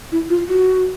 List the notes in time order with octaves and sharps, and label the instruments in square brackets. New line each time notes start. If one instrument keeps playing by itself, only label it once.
[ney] E4
F4
F#4